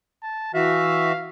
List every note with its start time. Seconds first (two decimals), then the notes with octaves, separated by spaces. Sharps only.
0.23 A5
0.54 E3 F#4 E5 F5